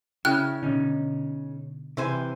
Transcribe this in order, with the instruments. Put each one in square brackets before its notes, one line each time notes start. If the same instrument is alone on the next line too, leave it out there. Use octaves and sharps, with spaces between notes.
[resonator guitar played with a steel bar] C#3 [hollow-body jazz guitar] E4 [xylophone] G5 F6 F#6
[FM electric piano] B2 D3 [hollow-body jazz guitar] C#4 D#4
[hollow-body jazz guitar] C3 [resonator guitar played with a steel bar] E3 C5 G#5